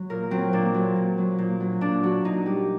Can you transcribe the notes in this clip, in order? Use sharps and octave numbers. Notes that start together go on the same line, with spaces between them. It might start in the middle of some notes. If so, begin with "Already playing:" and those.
Already playing: F#3
A#2 A#4
F#3 C4
A#2 D4
F#3
A#2
F#3
A#2
F#3
A#2 D4
F#3 F#4
A#2 D#4
G3 G4